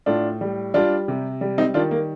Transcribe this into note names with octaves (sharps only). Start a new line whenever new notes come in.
A2 D4 F4
G3
G3 D4 F4
C3
G3
C4 D#4
D#3 D4 F4
A#3